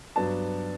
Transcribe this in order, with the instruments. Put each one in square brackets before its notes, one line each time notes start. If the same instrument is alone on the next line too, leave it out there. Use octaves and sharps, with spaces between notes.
[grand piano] G2 F#3 B3 D4 A5